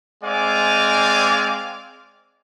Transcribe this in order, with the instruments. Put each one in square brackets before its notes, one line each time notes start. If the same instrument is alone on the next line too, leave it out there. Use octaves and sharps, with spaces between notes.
[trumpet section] G#3 C4 D5 F5 G#5 D6